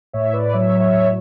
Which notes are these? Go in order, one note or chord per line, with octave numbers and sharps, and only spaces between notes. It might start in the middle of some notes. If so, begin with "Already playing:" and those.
A2 C#5 E5
C#5
B4 D5
F#3 C#5 E5
C#5 E5
A2